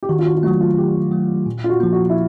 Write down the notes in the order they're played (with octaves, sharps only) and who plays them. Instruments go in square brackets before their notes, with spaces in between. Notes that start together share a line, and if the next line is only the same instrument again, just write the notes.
[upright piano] G4
[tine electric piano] D#3 [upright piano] F#4
[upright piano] F4
F#4
F4
[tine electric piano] A3 [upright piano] F#4
[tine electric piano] F#3
[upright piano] F4
[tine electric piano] D#3 [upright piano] G4
[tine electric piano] F#3 A3
A#2
[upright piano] F4
F#4
[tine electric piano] F3 A#3
[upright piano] F#4
E4